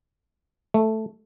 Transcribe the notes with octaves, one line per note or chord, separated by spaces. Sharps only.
A3